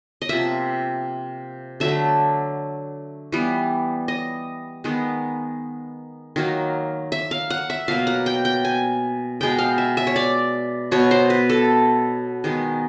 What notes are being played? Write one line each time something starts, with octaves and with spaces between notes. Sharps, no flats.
D#5
C3 F3 A#3 E5
D3 F#3 A3 E5
E3 G3 B3
D#5
D#3 G#3 B3
D#3 F#3 A#3
E5
F5
F#5
E5
B2 F#3 A#3 F5
F#5
G5
G5
G#5
B2 G#3 B3 G5
F5
E5
E5
C#5
D5
B2 F#3 B3 C#5
C5
B4
A4
D#3 G#3 B3